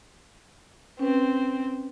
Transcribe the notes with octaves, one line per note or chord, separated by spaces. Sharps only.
C4 C#4 B4